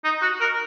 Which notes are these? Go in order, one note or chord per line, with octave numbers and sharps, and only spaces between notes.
D#4
F#4
A#4